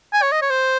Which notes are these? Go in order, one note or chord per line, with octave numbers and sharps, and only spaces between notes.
G#5
C#5
D#5
C#5
C5